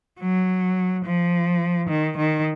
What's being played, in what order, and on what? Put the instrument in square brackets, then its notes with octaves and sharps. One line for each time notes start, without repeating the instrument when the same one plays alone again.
[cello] F#3
F3
D#3
D#3